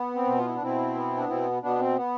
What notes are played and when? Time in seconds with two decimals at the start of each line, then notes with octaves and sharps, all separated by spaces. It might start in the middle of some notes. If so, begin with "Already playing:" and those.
Already playing: B3
0.15 C4
0.26 B2
0.38 F4
0.46 E4
0.55 D4
0.61 B2 C4 E4
0.95 B3
1.17 D4
1.28 B2 C4 E4
1.62 B2 B3 D4
1.79 C4
1.96 B3